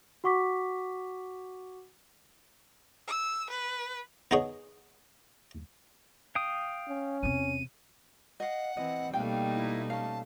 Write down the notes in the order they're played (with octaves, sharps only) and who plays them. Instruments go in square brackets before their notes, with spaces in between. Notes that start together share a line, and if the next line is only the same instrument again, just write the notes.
[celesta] F#4 F#5 C#6 D6 B6
[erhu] E6
B4
[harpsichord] B3 D#4 G#4 C#5
[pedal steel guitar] F5 G5 D#6
[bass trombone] C#4
[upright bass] E2 C3 [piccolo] D#7
[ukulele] D#5 F5 [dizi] F#5
[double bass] E3 C4 [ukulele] D#5
[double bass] B2 A3 [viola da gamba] G3 A#3 D#4 [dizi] F5 [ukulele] G5
[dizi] E4
[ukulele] C#4 F5 [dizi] A5